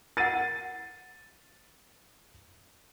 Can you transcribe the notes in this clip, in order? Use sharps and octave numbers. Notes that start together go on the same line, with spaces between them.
A#4 F#5 A6 D#7